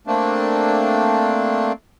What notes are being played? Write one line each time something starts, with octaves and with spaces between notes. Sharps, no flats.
A3 A#3 C4 D4